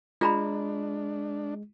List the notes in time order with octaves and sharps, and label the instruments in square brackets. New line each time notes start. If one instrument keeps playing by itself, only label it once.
[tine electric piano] G#3 [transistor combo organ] D4 [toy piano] F4 A#5 B5